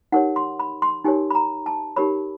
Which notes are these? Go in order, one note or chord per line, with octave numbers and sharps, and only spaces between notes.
D#4 G4 A#4 C#5 F#5
C6
B5
C6
D#4 G4 A#4 C#5 G#5
B5
A#5
A5
D#4 G4 A#4 C#5 B5